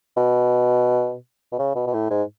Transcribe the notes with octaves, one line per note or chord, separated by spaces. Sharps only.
B2
B2
C#3
B2
B2
A2
G#2